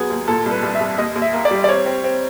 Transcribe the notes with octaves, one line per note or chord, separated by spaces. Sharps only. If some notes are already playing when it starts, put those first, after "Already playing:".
Already playing: D#2 F#3 B3 G#4
D#2
A#2 A4
C2
B4
C2
E5
C2
D#2 D#5
D#2
E5
A#3
D5
G3
D5
C4 C#5
C4
C4